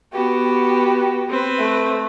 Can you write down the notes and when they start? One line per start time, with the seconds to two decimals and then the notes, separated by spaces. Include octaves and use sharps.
0.13 B3 F#4 G4
1.29 C4 B4
1.59 A3